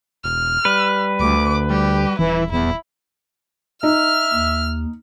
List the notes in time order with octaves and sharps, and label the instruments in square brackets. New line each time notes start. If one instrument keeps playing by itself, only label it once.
[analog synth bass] E1 [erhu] F6
[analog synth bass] G3 [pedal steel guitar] B4
[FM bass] D2 [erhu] D6
[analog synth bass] G3 [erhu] G4
[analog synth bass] D#1 [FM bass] E3 [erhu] E4
[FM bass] E2 [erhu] E4
[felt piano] D#4 [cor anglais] E5 [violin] F6
[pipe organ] D#2